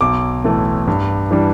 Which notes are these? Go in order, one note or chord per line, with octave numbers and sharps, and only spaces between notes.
B1 D6
A2 E3 A3
G2
E3 G3 D4